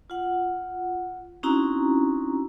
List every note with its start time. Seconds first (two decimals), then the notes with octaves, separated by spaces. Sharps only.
0.10 F4 F#5
1.43 C4 C#4 D#4 E4 F#4 A#5